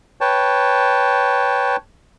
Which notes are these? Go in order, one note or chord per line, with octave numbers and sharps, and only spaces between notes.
B4 C#5 G5 A5